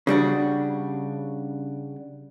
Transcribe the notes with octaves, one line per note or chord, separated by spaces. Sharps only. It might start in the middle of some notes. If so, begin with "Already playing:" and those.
C#3 G3 D4 F#4